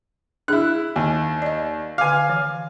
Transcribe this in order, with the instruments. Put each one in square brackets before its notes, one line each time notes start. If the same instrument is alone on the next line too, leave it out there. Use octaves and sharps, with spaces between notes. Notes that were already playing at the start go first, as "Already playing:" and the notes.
[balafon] D4 G#4 [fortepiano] E4 F#6
[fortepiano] D#2
[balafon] D5 D#5
[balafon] D3 D6 [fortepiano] F5 G#5
[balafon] E3